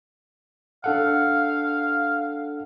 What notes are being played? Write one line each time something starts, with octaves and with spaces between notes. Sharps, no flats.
D4 A4 F5 F#5